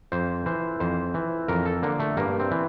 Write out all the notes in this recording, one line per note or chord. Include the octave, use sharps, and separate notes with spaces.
F2 C5
E3 C5
F2 C5
E3
F2 A#4
A4
D3 A#3
A3
G2 A#3
C4
E3